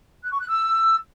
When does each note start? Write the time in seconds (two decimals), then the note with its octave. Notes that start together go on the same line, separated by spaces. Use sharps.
0.23 F#6
0.31 C#6
0.40 F#6
0.48 E6